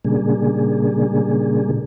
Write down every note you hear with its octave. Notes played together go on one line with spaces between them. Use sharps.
A#2 C#3 G3 A#3 D4 G#4